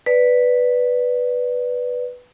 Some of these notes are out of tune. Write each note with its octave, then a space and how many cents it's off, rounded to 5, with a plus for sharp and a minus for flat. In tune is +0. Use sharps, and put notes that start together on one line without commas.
B4 +0 D5 +0